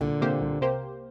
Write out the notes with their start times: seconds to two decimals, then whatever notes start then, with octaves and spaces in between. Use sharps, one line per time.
0.01 C2 A#2 D3
0.21 C3 A#3 G4 C5
0.41 C2
0.61 C3 A#3 G4 C5